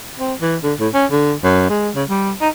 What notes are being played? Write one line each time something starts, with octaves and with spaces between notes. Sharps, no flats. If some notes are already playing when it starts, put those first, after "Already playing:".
C4
E3
D3
A2
C#4
D3
F#2
G#3
C#3
G3
D#4